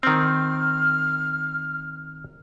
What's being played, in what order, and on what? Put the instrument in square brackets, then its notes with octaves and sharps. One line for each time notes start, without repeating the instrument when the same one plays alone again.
[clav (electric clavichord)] D#3 C4 [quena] F6